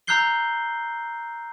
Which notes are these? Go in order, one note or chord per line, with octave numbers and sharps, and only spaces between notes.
A#5 E6 F#6 G6 C7 G7